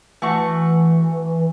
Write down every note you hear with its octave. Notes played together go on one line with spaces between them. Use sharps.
E3 A3 F#4 C#6